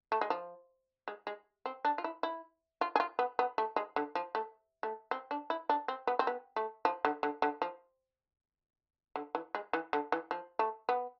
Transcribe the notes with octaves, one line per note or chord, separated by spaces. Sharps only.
A3
G#3
F3
G#3
G#3
C4
D4
F4
E4
E4
F4
G#4
F4
B3
B3
A3
G#3
D3
F3
A3
A3
C4
D4
E4
D4
C4
B3
C4
B3
A3
F3
D3
D3
D3
F3
D3
E3
G#3
E3
D3
E3
F3
A3
B3